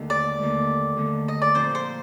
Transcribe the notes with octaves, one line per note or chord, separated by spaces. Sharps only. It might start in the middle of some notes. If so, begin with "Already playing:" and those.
Already playing: D#2 D3 A3
D5
D#2 D3 A3
D#2 D3 A3
D#5
D5
A#2 F3 C4 C5
C5